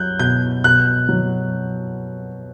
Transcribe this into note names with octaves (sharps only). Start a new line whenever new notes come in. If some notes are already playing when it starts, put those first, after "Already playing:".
Already playing: F#3 F#6 G6
B2 G6
B2 F#6
F#3